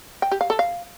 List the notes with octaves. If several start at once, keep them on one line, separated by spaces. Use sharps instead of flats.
G5
G4
F5
A4
F5